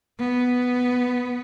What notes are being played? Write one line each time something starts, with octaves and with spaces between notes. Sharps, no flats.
B3